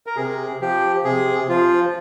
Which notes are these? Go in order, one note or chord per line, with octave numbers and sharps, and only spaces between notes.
A#4
C3 G#4
F3 G4
C3 G#4
F3 F4